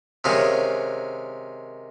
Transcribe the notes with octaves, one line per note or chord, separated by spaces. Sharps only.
C3 D#3 G#3 C#4 F4